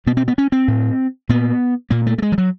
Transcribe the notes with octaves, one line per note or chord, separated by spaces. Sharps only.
B2 B3
C4
B3
C#4
C4
A2
A#2 B3
A#2 A#3
A3
A3
G#3
F3
F#3